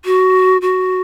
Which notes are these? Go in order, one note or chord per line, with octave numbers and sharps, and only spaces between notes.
F#4
F#4